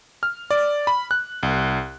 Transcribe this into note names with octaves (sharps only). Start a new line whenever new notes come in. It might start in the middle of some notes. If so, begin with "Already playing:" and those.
F6
D5
B5
F#6
C2